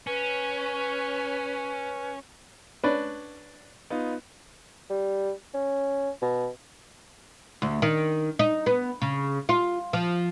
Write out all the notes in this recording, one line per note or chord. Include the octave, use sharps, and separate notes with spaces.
C#4 B4
C#4 D4 B4
B3 D#4 F4
G3
C#4
B2
D2
D#3
D#4
B3
C#3
F4
F3